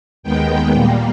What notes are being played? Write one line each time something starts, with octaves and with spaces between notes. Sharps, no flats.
D#2 D#3 G#3 B3 G5
A#2 G3 A#3